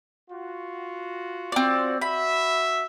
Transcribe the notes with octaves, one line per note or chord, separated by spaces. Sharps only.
F4 F#4
C4 D5
F#4 E5 B5